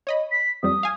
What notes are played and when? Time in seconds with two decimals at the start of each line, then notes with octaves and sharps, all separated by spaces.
0.07 C#5 D#5 B5
0.31 B6
0.63 F2 G3 D#6
0.83 F5 G#5